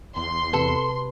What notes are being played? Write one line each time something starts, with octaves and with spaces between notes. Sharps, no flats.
E2 C6
C3 A4 B4